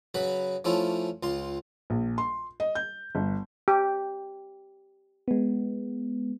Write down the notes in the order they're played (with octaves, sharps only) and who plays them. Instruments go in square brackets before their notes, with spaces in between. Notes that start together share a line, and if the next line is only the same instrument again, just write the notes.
[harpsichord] C#3 F#3 B4 B5
F3 A3 C#4 E4 F4
C#2 F4 C6
[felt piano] A#1
C6
D#5
G6
G1
[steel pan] G4
[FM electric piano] G#3 B3